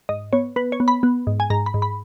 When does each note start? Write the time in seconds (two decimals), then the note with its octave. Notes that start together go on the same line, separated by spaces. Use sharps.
0.09 G#2 D#5
0.33 B3 C#5
0.56 B3 B4
0.72 C#5
0.80 B3
0.88 B5
1.03 B3
1.27 G#2
1.40 G#5
1.50 G#2 A#5
1.66 B5
1.74 G#2
1.82 B5